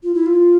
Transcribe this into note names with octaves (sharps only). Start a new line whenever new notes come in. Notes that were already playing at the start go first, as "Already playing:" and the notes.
F4
E4
F4